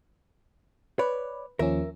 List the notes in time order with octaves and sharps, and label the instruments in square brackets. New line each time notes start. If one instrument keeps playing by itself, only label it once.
[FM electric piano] B4 [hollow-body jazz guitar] C#5 D5
[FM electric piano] D#2 F3 C#4 [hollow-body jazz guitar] A#4 E5